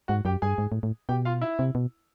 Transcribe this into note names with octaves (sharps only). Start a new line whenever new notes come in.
G#2 F#4 F#5
F#2 G4 G5
G2 G#4 G#5
G#2
A2
A2
B2 G4 G5
F4 F5
E4 E5
C3
B2